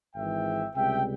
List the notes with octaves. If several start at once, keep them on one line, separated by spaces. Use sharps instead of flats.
G#1 G#2 E3 E5 G5
C#2 C3 G3 E5 G5